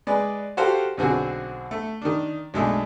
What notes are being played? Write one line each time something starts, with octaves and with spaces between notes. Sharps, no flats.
G#3 G#4 B4 D5
F#4 G4 A4 C5 F5
B1 D3 C4 F#4 G#4
A3
D#3 D4
B1 G#3 A3 D4